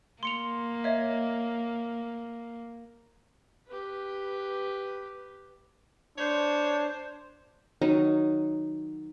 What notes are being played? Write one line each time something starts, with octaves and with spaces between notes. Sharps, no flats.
A#3 C6 C#7 F7
C#5 D#5 E5
G4 B4
D4 C5 C#5
D#3 F#3 D#4